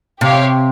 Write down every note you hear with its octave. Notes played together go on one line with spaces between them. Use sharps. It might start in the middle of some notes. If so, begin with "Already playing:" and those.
C3 G4 C#5 F5